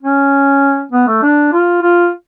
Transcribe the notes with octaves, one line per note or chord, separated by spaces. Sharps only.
C#4
B3
A3
D4
F4
F4